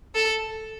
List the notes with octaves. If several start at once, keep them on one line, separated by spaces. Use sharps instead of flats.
A4